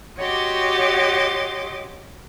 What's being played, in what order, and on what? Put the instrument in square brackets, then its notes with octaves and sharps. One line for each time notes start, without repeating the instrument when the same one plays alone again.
[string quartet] F#4 G4 C#5 D#5 C6 D6